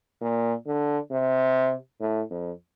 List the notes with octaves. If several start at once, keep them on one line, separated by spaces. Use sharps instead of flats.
A#2
D3
C3
A2
F2